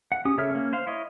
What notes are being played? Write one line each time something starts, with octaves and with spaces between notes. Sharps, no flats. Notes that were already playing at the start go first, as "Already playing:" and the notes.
F#5
C#4 G4 D#6
C#3 A4 C#5 E5 F6
A#3 C#4
C5 F5
E4 C#5 D#5